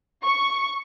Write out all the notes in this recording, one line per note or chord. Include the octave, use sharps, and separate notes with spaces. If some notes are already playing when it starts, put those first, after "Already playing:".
C#6